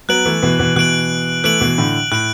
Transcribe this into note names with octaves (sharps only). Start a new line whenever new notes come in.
F#3 B3 F#6 D7 F#7
E3 A3
B2 E3
B2 E3
B2 E3 F#6 D7 F#7
E3 A3 F#6 D7 F#7
B2 E3
A2 D3
A2 F#6 D7 F#7